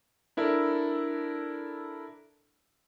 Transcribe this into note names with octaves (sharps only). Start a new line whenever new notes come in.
D4 E4 A4 A#4 D5